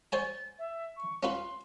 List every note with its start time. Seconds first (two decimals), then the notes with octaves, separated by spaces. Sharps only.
0.12 C5 C#5 G#5 A6
0.59 E5
0.96 C#6
1.23 C#4 F4 B4 C6